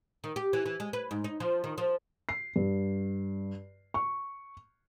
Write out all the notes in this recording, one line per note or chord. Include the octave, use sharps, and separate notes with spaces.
D#3
G4
E3
E3
G#3
B4
G#2
D#4
F3
D#3
F3
C7
G2
C#6